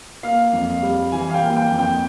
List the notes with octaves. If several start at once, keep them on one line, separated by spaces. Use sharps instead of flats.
A#3 F5
F2
G3
E3 G#5
F5
G5
A#3
G5
F2
G5